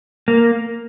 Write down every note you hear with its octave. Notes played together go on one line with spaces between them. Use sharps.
A#3